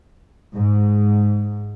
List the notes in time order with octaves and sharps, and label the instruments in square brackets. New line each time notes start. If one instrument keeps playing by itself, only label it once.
[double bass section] G#2